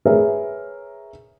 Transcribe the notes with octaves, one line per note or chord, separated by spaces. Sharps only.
G#4 A#4 B4 C#5 E5